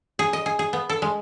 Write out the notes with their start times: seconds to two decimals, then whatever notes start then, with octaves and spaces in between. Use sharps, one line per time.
0.19 G#4
0.33 D#5
0.46 G#4
0.59 G#4
0.73 B3
0.89 A4
1.02 G#3